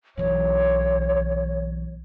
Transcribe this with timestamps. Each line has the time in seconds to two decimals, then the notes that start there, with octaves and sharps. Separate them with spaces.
0.17 B1 E3 C#5